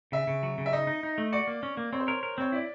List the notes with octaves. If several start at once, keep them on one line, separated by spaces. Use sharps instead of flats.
C#3 E5
C#3
F#3
C#3
E5
D#4 D#5
D#4
D#4
A3
F#4 D5
A#3
C#4
A#3
C4 C#5
C5
A#4 C#5
A#4
C4 C#5
E4 D5